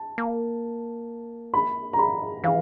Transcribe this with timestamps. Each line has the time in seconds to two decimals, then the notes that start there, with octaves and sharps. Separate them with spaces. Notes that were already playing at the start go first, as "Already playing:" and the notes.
Already playing: A5
0.18 A#3
1.54 B5
1.93 A#5
1.99 B5
2.44 E3 F5